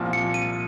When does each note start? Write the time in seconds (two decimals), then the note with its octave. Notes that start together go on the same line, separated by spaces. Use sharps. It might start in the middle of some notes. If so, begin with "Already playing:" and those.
Already playing: C2 A#2 F3
0.13 C#7
0.34 D#7